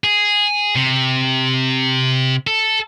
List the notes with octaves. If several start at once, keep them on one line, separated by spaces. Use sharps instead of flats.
G#4
C3
A4